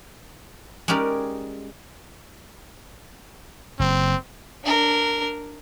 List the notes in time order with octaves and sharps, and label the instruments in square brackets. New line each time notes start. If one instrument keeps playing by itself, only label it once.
[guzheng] G#3 C#4 D#4 G4 A#4 D5
[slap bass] F#1 [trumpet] C4
[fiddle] D4 A#4